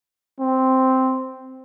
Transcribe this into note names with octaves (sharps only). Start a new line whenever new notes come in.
C4